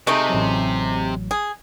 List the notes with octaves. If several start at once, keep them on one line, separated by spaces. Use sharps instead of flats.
C3 G#3 A3 D#4
A1 F#3
G#4